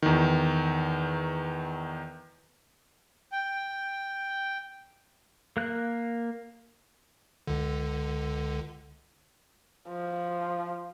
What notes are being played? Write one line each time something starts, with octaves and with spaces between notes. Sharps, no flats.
E2 D#3
G5
A#3 F#6
C#2 D3
F3